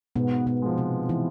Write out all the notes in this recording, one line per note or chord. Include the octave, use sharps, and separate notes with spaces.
G#2 B2 B3
B2 B3
F3 G#3
C3 C4
E3 E4